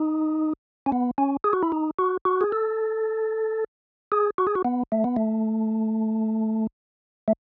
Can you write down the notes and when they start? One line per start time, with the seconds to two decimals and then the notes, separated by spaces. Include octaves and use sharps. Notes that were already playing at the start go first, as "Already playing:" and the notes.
Already playing: D#4
0.86 C#4
0.92 B3
1.18 C#4
1.44 G#4
1.53 F#4
1.63 E4
1.72 D#4
1.99 F#4
2.25 F#4
2.41 G#4
2.52 A4
4.12 G#4
4.38 F#4
4.47 G#4
4.55 F#4
4.65 B3
4.92 A3
5.04 B3
5.16 A3
7.28 A3